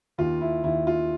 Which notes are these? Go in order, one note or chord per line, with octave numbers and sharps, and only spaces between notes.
D#2 F4
E4
D#2 E4
F4